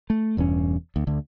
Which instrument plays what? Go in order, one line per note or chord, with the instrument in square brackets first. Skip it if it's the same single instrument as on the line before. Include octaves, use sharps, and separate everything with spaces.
[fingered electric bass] A3
E1 E2 G2 C#4
D2
D2 D3